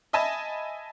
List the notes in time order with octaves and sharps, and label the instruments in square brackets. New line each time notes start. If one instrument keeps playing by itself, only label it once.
[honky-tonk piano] D#5 E5 G#5 A5 B5